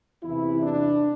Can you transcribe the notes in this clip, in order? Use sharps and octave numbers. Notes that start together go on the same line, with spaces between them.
E2 C3 E3 E4
D4